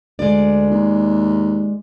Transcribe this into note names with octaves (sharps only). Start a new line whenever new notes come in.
D2 G#3 D5
D#2